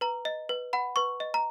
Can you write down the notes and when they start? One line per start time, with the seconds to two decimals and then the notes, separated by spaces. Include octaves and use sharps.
0.01 B4 A#5
0.25 D#5
0.49 B4
0.73 F#5 B5
0.96 B4 C#6
1.20 D#5
1.34 A#5